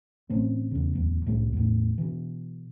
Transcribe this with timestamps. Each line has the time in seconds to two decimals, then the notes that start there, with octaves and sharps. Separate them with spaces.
0.29 A1 A2 C4 C#4
0.71 E2 C#3
0.93 D1 E2
1.25 C2 A2 G#3
1.53 E2 A2
1.98 B2 E3